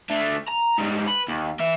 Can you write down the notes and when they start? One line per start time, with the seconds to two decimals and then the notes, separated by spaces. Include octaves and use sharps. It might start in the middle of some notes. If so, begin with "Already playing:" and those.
0.10 D3 A3
0.48 A#5
0.78 G#2 G3
1.07 B4
1.29 D#2
1.60 E3 E5